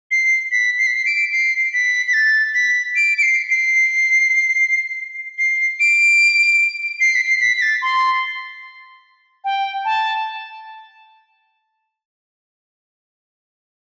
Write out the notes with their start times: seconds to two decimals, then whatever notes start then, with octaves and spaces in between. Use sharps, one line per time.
0.11 C7
0.52 B6
0.79 C7
0.87 B6
0.95 C7
1.06 D7
1.32 C7
1.74 B6
2.07 B6
2.14 A6
2.55 B6
2.96 D7
3.18 D7
3.23 C7
3.50 C7
5.38 C7
5.80 D7
7.00 C7
7.15 B6
7.21 C7
7.41 B6
7.57 B6
7.62 A6
7.82 C6
9.44 G5
9.85 A5